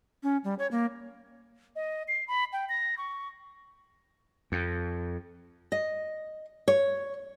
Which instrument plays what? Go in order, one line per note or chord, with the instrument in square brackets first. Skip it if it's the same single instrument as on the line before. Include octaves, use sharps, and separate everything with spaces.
[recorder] C#4
G3
C#5
A#3
[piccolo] D#5
C7
B5
G5
A#6
C#6
[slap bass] F2
[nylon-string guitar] D#5
C#5